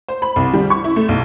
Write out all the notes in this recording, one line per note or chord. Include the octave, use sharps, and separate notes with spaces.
C5
B5
C2
G3
C#6
E4
A3
B1